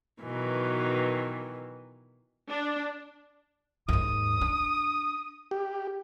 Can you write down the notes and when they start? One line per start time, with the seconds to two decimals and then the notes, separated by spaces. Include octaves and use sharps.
0.22 B2 D#3 E3 F#3
2.49 D4
3.89 D#2 G#2 D#6
4.41 D4
5.51 G4